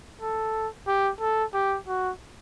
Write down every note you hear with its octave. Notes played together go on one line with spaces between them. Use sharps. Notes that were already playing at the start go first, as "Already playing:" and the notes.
A4
G4
A4
G4
F#4